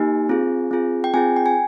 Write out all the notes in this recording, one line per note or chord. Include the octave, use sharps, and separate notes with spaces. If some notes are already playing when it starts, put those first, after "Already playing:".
Already playing: A#3 D#4 G4 G#5
C4 F4 G#4
C4 F4 G#4
G5
C4 F4 G#4 G#5
G5
G#5